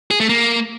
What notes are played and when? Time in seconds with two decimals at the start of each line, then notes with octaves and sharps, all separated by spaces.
0.11 G#4
0.20 A3
0.29 A#3